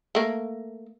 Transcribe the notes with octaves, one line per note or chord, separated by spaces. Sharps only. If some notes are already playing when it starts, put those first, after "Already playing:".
A3 A#3